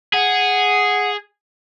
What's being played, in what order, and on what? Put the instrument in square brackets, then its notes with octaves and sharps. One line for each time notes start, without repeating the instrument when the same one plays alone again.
[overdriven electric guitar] G#4 [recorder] F#5